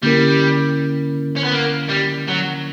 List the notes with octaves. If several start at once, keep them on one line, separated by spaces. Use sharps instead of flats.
D3 G3 A#3 C#4 E4 A#4
C#4
B3
A#3
G3
F#3